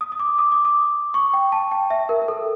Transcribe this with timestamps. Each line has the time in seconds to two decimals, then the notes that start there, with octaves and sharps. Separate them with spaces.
0.01 D#6
0.12 D#6
0.20 D6
0.38 D#6
0.52 D6
0.65 D#6
1.14 C#6
1.33 G5
1.52 A5
1.71 G5
1.90 E5
2.09 A#4
2.22 A#4
2.28 A4